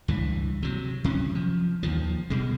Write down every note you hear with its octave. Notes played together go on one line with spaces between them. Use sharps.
C#2 G2 E3
C3 F#3
C3 F#3 A#3 C#4
F3
D#2 D#3 F3
B2 G3 G#3